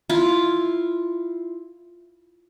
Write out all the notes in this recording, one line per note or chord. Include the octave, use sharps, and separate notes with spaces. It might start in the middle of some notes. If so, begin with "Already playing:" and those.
E4 F4